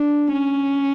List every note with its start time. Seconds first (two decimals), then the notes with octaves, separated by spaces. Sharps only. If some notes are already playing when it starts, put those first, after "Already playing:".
Already playing: D4
0.32 C#4